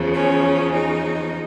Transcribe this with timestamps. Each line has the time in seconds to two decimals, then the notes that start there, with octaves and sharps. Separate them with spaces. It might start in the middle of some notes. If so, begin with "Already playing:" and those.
Already playing: E2 C#3 F3
0.14 C#4
0.74 D#4